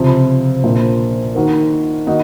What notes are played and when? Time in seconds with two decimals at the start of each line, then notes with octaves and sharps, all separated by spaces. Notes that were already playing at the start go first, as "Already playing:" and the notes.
Already playing: C#2 C3 F3
0.63 A#1 A#2 F3 A#3
1.35 D#3 A#3 D#4 F#4 A#4
2.07 D#3 A#3 D#4 F#4